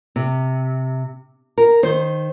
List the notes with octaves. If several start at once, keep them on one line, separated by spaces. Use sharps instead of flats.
C3
A#4
D#3 C5